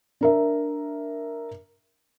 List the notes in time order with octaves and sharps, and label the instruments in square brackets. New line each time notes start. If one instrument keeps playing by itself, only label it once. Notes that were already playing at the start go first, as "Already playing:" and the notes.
[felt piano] D4 A#4 E5